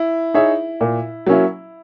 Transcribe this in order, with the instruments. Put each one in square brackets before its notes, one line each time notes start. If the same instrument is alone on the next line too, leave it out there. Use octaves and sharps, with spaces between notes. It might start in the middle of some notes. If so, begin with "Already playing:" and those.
Already playing: [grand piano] E4
[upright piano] D#4 G#4 C#5 E5
A#2
F#3 A#3 C#4 E4